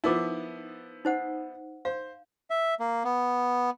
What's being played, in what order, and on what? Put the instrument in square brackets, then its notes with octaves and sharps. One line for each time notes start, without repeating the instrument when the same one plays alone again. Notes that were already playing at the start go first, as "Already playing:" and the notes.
[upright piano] F3 B3 E4 [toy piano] D#4 A#4 D6
[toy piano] D#4 C5 F#5
[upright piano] C5 [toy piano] F5
[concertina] E5
A#3
B3